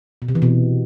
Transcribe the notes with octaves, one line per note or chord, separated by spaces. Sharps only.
B2
C3
E3
B2